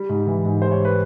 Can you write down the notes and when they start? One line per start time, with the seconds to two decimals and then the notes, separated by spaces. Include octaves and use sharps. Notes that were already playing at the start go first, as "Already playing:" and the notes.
Already playing: G3
0.09 G#2
0.27 E3
0.45 G#2
0.62 G3 C5
0.71 C#5
0.85 B4